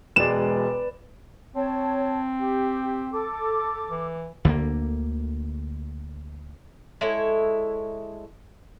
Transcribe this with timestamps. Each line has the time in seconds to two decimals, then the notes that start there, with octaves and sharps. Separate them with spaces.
0.16 E1 G#3 B4 D5 E7
1.56 C4 C#5 A5
2.38 G4
3.12 A4 D6
3.91 E3
4.45 D2 D3 F3 A#3
7.01 G#3 E4 A4 C#5